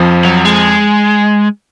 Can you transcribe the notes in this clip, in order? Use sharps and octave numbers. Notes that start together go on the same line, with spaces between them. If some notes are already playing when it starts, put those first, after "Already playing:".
Already playing: F2 F3
F#3
G#3